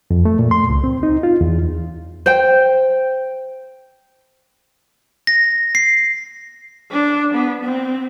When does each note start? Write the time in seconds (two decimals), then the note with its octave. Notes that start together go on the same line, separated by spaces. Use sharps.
0.11 F2
0.25 A3
0.39 A#2
0.51 C6
0.69 C#2
0.84 C4
1.03 D#4
1.23 F4
1.41 E2
2.26 C5 G5
5.27 A#6
5.75 C7
6.92 D4
7.34 B3
7.64 C4